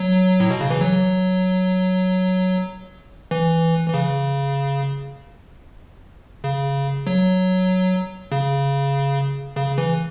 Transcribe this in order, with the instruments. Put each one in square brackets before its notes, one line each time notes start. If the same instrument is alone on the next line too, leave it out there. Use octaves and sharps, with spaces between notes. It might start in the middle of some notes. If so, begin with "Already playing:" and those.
Already playing: [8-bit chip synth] F#3
A2
B2
C#3
E3
F#3
E3
E3
C#3
C#3
F#3
C#3
C#3
E3